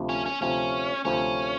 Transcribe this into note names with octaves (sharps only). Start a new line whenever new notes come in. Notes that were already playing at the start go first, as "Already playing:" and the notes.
Already playing: D2 C3 F3
C#4
C#4
D2 C3 F3 C#4
D2 C3 F3 C#4